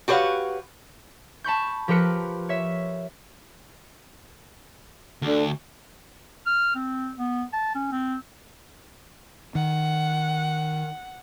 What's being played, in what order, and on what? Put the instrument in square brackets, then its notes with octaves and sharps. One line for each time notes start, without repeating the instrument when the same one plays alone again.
[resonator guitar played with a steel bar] F#4 G4 B4 C#5 F5 F#5
[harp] A5 B5 C#6 G6
F3 G4 A#4 B4 C#7
C#5 E5
[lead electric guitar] D2 [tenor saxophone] D3
[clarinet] F6
C4
B3
A5
C#4
C4
[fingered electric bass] D#3 [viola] F#5